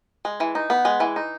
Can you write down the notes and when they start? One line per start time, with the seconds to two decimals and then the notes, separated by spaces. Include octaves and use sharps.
0.25 G#3
0.40 E3
0.55 D#4
0.70 B3
0.85 G#3
1.00 E3
1.16 D#4